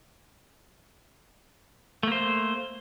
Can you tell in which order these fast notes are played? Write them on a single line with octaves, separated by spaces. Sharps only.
A3 A#3 C5